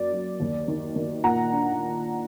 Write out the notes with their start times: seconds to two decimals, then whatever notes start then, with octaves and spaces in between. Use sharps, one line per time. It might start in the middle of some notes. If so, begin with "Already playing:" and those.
Already playing: F#2 F#3 A#3 D5
0.13 F#3
0.40 D#2
0.68 D#3
0.96 D#3
1.24 A#2 F#5 A#5
1.52 D4